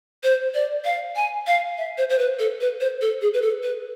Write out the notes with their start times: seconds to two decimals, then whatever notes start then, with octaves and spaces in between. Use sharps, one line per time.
0.24 C5
0.54 D5
0.85 F5
1.16 G#5
1.47 F5
1.78 E5
1.98 C5
2.10 C5
2.19 B4
2.39 A4
2.61 B4
2.81 C5
3.01 A4
3.22 G#4
3.34 B4
3.42 A4
3.63 B4